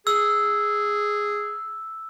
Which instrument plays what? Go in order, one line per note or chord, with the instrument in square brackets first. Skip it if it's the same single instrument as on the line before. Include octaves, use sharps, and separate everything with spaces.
[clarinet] G#4 [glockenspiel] E6